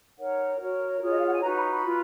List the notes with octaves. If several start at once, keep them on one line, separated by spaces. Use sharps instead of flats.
D#4 A#4 C#5 F#5
F#4 A#4 C#5
F4 G#4 C#5
D#5
F5
F#5
G#5
D#4 F#4 B4 A#5
B5
B5
F4 B4